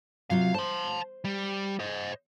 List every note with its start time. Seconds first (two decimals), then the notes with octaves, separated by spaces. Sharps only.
0.30 C3 F#3 F4 F5
0.55 C5 A5 C6
1.25 G3
1.80 C5 D#5